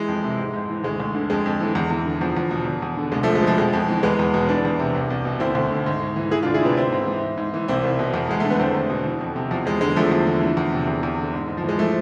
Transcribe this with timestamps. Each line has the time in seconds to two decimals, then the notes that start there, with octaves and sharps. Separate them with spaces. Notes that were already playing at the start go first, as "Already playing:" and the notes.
Already playing: E3 G#3
0.08 F2
0.24 C3
0.39 G#2
0.53 G#2
0.70 E3
0.84 D2 G#3
1.00 D2
1.15 D3
1.30 F2 G#3
1.46 F2
1.61 E3
1.75 E2
1.91 E2
2.05 D3
2.21 E2 F3
2.37 E2
2.51 B2
2.66 E2
2.82 E2
2.97 D3
3.12 C2 G#3
3.23 F3 A3
3.28 C2
3.35 G#3
3.42 B2 F3
3.58 F2 G#3
3.73 F2
3.88 E3
4.03 E2 G#3 B3
4.19 E2
4.34 B2
4.49 E3 B3 D4
4.65 E2
4.79 C3
4.95 C2
5.10 C2
5.25 B2
5.40 D2 C4 E4
5.55 D2
5.70 D3
5.86 G#2
6.02 G#2
6.16 E3
6.31 E3 E4 G#4
6.43 D4 F4
6.46 D2
6.54 E4 G#4
6.63 C3 B3 D4
6.77 G#2 C4 E4
6.92 G#2
7.08 E3
7.23 G#2
7.37 G#2
7.54 E3
7.68 C2 C4 E4
7.84 C2
7.99 B2
8.14 E2
8.29 E2 G#3
8.40 D3 A3
8.50 B3
8.59 E2 A3 C4
8.75 E2
8.89 B2
9.05 E3
9.21 F2
9.36 C3
9.51 E2 F3
9.66 E2 G#3
9.81 D3 G#3
9.96 E2 F3 A3
10.11 E2
10.27 D3
10.42 E3
10.57 E2
10.72 C3
10.87 E2
11.03 E2
11.19 D3
11.34 G#2
11.48 G#2
11.57 F3
11.64 E3 G#3
11.79 E3 F3 A3